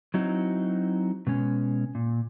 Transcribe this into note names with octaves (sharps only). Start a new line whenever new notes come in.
F#3 C4 D#4 E4 F#4
B2 G#3 C#4
A#2